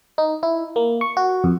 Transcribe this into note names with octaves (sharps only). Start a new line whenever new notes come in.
D#4
E4
A#3
C#6
F#4
F2